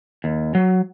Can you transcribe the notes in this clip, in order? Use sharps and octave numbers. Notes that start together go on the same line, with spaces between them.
D#2
F#3